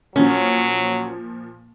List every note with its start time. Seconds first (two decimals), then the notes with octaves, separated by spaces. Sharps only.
0.16 A#2 F3 F#3 C#4